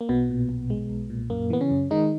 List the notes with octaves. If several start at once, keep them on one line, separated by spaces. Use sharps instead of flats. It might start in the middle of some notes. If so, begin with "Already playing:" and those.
A#3
B1 B2 B3
A#2
B1
G#3
B1
A#2
F#2 A#3
E3 B3
C#3 C#4
F#2
D#3 G#3 D#4